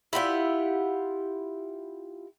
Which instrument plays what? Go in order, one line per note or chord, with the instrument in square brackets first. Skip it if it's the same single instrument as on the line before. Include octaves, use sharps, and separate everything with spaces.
[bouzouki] E4 F4 G4 F#5